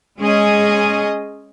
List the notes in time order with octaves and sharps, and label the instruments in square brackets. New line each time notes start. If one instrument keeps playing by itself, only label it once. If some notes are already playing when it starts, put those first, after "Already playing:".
[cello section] G#3 C#4 G#4 D#5